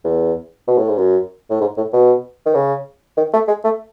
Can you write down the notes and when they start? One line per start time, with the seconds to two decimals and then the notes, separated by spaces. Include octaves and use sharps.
0.05 E2
0.68 B2
0.78 A2
0.89 G#2
0.98 F#2
1.50 A2
1.61 G#2
1.77 A2
1.93 B2
2.46 D#3
2.55 C#3
3.17 D#3
3.34 A3
3.48 G#3
3.64 A3